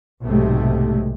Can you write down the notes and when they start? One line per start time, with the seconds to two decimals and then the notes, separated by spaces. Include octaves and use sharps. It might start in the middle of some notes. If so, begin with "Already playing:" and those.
0.22 B1 G#2 C3 G#3 A3